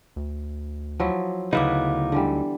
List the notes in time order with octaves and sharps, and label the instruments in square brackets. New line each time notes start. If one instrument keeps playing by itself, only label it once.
[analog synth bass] D2
[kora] F3 F#3 E4
[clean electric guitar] D2 F#3 D#4 [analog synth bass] C#3 [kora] B3 [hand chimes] E4 F5 D6
[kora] D3 E3 G3